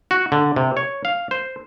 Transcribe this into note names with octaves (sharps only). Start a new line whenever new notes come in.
F#4
D3
C3
C#5
F5
C5